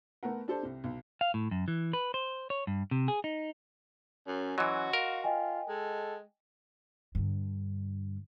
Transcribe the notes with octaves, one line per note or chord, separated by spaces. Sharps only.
A3 B3 A#4 F#5
D4 G4 A4 C5
C2 C3
B1
F5
A2
F#2
E3
B4
C5
C#5
G2
C3
G#4
D#4
F#2 C#4
E3 F#3 F#4 D#5 C6
A#4 F5
F4 D#5 G5 G#5
G#3 A4
G2 D3